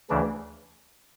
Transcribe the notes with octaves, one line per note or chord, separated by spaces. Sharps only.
D2 C#3 E3 D4